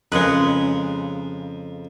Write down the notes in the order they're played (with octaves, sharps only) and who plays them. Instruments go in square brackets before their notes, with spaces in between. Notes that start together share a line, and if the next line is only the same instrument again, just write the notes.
[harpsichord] F2 A#4 [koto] C#3 G#3 B4